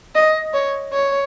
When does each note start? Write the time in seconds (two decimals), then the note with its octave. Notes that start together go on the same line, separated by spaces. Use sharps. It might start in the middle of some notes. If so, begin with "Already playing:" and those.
0.15 D#5
0.53 C#5
0.93 C#5